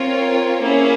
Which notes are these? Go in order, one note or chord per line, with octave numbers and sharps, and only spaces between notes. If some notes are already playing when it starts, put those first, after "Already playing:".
Already playing: C4 F4 A#4 C#5
A#3 C#4 E4 G#4 C#5